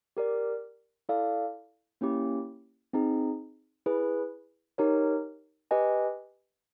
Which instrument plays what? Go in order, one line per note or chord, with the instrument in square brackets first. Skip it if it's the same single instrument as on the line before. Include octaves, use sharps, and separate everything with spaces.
[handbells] G4 A#4 D5
E4 A4 D5 F5
A#3 C#4 E4 G4
C4 D#4 G#4
E4 G#4 B4
D#4 G4 A#4 C#5
G4 B4 D#5 G#5